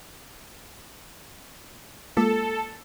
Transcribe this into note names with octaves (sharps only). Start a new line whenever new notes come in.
G#3 A#3 F4 A4